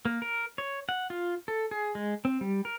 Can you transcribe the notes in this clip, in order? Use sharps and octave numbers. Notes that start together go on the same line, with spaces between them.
A#3
A#4
C#5
F#5
F4
A4
G#4
G#3
C4
G3
A#4